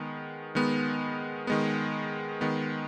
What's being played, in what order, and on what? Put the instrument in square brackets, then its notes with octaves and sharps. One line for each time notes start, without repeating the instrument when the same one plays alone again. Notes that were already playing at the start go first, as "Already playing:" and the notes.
Already playing: [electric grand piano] D#3 G#3 B3
D#3 G#3 B3
D#3 G#3 B3
D#3 G#3 B3